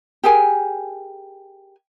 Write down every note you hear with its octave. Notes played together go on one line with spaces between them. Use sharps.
G4 G#4 A#4 G#5